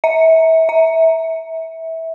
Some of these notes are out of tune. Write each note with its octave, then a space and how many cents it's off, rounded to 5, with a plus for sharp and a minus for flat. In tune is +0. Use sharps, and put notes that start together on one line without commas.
E5 -30
E5 -20